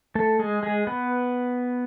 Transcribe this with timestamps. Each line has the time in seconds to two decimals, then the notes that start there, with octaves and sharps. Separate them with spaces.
0.15 A3 A4
0.39 G#3 G#4
0.63 G#3 G#4
0.87 B3 B4